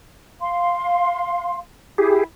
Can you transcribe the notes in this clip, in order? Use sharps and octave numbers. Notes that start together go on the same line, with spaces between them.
F5 C6
E4 G4 G#4